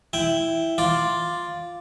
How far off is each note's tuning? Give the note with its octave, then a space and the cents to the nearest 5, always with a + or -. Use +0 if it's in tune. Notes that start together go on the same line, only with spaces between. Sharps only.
E4 +0 G5 +0
F4 +0 D5 +0